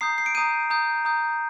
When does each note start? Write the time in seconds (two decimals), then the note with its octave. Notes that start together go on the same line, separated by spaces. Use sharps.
0.01 A#5 D#6 G6 C7
0.18 C7
0.26 D7
0.35 A#5 D#6 G6 D#7
0.70 A#5 D#6 G6
1.05 A#5 D#6 G6